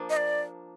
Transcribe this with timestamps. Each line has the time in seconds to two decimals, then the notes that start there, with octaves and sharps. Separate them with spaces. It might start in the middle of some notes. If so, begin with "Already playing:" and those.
Already playing: F3 A#3 D4
0.10 D#5
0.17 D5